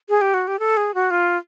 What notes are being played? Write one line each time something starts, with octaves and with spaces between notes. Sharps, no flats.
G#4
G4
F#4
G4
A4
G#4
F#4
F4